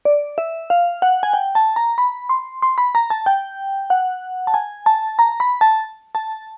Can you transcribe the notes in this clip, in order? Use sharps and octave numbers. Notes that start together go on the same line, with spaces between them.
D5
E5
F5
F#5
G#5
G5
A5
A#5
B5
C6
C6
B5
A#5
A5
G5
F#5
A5
G#5
A5
A#5
B5
A5
A5